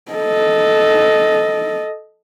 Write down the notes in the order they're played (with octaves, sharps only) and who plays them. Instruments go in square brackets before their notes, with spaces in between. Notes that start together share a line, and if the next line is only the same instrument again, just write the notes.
[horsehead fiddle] A4 D#5